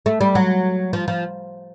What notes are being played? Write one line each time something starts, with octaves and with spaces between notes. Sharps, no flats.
A3
G3
F#3
F3
F3